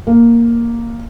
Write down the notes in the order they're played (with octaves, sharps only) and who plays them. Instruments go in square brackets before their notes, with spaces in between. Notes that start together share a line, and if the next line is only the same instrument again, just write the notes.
[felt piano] A#3